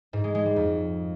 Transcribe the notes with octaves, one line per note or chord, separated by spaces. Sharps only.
G#2
G#3
G#3
G3
F2